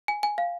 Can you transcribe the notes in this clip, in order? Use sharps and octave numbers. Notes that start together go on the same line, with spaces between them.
G#5
G#5
F5